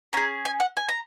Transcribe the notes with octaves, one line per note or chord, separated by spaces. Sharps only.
C#4 G#4 A#5
G#5
F#5
G#5
A#5